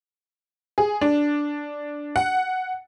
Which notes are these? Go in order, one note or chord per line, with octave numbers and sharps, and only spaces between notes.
G#4
D4
F#5